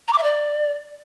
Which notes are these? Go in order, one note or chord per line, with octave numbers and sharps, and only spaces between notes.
A#5
D6
E5
D5